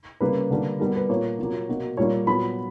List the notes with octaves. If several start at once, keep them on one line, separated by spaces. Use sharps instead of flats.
C#3 G3 A#3 B4
D3 G3 A#3
B2 G3 B3 A#4
B4
A#2 A#3 C#5
A#2 F#3 A#3
B2 A#3
A#2 G3 A#3 C#5
A#2 F#3 B3 B5